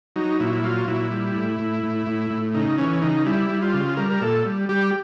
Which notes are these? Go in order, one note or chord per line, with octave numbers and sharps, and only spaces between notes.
F#3 D#4
A#2 E4
E4
F#3 F4
A#2 E4
G3
A2
A2
A2
A2
A2
C#3 D#4
E3 C#4
C#3 D#4
G3 E4
G3
F4
C#3
G3 A#4
A#4
A#2 A4
G3
G3 G4